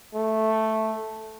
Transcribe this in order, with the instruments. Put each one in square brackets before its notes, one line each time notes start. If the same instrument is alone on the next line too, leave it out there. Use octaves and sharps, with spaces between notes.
[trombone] A3